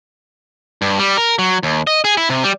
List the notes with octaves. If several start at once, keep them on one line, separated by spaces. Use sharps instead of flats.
G2
G3
A#4
F#3
D#2
D#5
G#4
E4
C3
G3